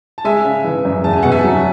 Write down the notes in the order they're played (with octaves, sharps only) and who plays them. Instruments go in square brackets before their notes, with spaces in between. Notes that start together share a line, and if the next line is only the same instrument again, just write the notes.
[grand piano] A5
[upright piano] G#3 [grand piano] E5 G#5
[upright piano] C#3
E3
F#2
[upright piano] E2 [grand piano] A5
[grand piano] G#5
[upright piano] B2 [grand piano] F#5
[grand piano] E5 G#5
[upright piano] F#3